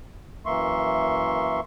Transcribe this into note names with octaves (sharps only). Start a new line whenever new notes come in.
F#2 E3 A#3 E5 C6 C#6